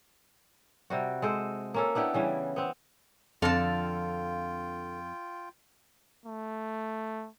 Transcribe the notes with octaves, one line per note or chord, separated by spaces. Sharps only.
C3 G3 F#4
G#3 A4 C5
A#3 C#4 A4
B3 D4 E4 G4
C#3 E3 G3 C#4
B3 C4
F2 D3 C4 F4 A4 F5 G5 A5
A3